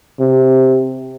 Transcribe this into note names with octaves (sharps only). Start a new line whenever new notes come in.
C3